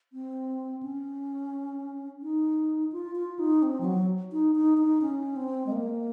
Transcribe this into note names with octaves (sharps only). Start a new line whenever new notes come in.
C4
C#4
D#4
F4
F4
D#4
C4
F3
F#3
D#4
D#4
D#4
C#4
C4
G#3
A#3